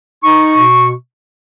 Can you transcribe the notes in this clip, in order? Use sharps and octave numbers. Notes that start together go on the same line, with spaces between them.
D#4 C#6
B2